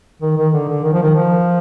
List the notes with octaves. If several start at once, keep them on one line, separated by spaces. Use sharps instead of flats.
D#3
D#3
D3
D3
D#3
F3
D#3
F3